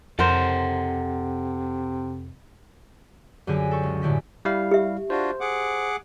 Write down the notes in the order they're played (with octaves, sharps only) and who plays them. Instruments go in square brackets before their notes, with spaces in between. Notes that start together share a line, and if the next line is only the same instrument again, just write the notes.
[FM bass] F2 [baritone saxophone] C3 [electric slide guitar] A4 D#5 F#5 [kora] A#4 C5
[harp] F#2 D3 G4 G#4 B6
A4 C#6
C#2
F#2 A2 D3 G4 B6
[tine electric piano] G3 E4 F5
[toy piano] G4 E5
[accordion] D4 F4 F#4 [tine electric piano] C5
[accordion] G#4 F#5 D6